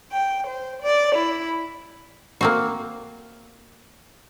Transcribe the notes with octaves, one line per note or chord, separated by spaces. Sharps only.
G5
C5
D5
E4
A#3 C4 F#4